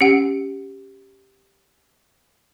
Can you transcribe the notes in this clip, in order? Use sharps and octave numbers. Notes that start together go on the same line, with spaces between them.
C#4 G4 F#5 C7 C#7